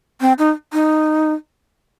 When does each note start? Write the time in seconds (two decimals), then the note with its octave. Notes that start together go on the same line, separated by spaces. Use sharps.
0.21 C4
0.39 D#4
0.73 D#4